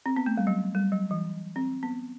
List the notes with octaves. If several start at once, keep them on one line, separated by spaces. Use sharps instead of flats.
C4
B3
A3
G3
F#3
G3
F#3
E3
C4
B3